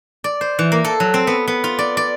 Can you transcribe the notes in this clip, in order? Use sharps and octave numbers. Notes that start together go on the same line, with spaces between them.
D5
C5
E3
A#3
A4
F#3
C4
B3
B3
F4
D5
D5